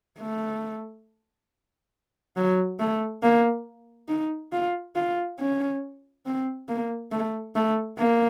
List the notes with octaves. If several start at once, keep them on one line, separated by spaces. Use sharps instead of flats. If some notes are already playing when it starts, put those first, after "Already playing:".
A3
F#3
A3
A#3
D#4
F4
F4
C#4
C4
A#3
A3
A3
A#3